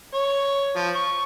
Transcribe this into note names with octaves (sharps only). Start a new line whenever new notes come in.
C#5
F3
C#6